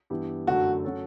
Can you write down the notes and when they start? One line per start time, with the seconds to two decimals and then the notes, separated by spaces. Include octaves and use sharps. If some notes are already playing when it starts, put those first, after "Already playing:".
0.10 G2 E3 B3 E4 G4
0.47 F#2 D3 A3 F#4
0.83 F#3 C#4 F#4 A4 C#5